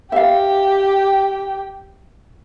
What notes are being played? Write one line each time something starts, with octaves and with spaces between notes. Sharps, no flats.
G4 E5 F5 G5